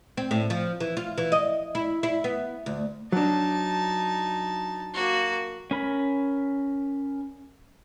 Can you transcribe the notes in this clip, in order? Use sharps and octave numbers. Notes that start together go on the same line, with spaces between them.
C4
A2
F3
E3
F4
E3
D#5
E4
E4
B3
D2
F#3 D4 D#4 A5
A#3 F#4
C#4 A#4 B5